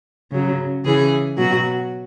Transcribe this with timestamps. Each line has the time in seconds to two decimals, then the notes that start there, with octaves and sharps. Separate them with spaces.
0.31 C#3 F#3
0.84 C#3 E3 G#4
1.37 B2 F#3 F#4